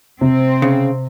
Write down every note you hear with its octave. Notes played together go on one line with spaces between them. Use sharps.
C3 C4
C#3